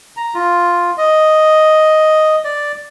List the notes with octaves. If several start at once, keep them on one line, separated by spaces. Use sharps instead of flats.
A#5
F4
D#5
D5